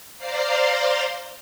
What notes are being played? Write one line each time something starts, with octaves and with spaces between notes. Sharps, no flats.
C5 D5 F5 A#5 C6